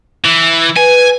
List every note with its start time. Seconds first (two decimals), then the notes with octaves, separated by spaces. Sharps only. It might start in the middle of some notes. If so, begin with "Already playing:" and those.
0.25 E3
0.76 B4 G#5